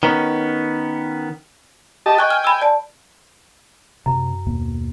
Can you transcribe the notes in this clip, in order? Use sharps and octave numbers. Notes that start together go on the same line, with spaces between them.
D#3 B3 C#4
G4 D#5 A5
D#5 G5 G#5 C#6 F#6
F6
B5 E6
D5 A5
F#2 C3
D#2 B2 A#3